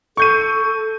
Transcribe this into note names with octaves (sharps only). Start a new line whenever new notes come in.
A4 C#6 G6 D#7